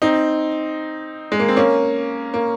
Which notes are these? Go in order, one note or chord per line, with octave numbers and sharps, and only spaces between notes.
C4 D#4
G#3
A#3
C4
A#3 C#4
A#3